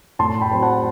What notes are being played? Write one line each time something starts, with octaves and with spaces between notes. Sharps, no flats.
A2 A5 C6
G5 B5
F#3 C4
F#5 A5